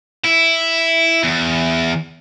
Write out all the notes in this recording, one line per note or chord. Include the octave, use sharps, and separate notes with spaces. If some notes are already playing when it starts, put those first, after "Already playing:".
E4
E2